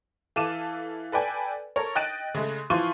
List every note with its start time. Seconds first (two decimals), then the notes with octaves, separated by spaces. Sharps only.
0.36 E3 A4 F5 D6 D#7 E7
1.12 A4 B4 D5 G5 G#5
1.76 A4 A#4 C#5
1.95 D#5 G5 F#6 A6 D7 D#7
2.35 C#3 G#3 A3
2.70 E3 F3 F5 C6 C#6 D#7